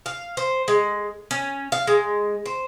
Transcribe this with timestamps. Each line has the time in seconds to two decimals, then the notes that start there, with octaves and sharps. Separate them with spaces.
0.06 F5
0.37 C5
0.68 G#3
1.31 C#4
1.72 F5
1.87 G#3
2.46 C5